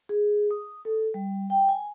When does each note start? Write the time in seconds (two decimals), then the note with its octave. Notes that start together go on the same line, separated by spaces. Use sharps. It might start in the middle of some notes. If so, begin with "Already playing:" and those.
0.09 G#4
0.51 D#6
0.85 A4
1.14 G3
1.50 G5
1.69 G#5